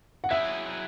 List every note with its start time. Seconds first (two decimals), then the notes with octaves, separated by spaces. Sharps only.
0.24 F#5
0.30 F#3 E4 G#4 E5